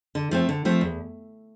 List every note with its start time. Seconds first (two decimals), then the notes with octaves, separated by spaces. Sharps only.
0.15 D3
0.31 F3 A3 C4
0.49 D3
0.65 F3 A3 C4
0.81 E2